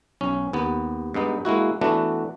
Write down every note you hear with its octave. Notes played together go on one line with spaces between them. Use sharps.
B1 C#4
D#2 B3
G2 G#3 B3 D#4
G#3 A#3 E4 F#4
E3 A3 B3 D4 F#4